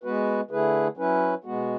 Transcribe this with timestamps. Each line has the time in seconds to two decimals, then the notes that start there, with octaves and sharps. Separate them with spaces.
0.04 G#3 B3 F#4 B4
0.51 D3 A3 E4 G#4 B4
0.97 F#3 C#4 E4 B4
1.44 B2 G#3 B3 F#4